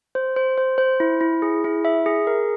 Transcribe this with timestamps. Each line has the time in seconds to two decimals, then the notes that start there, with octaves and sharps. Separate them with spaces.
0.15 C5
0.36 C5
0.58 C5
0.78 C5
1.00 E4
1.21 E4
1.42 G#4
1.64 E4
1.85 E5
2.06 G#4
2.27 A#4